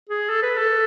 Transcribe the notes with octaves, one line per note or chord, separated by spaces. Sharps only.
G#4
A4
B4
A4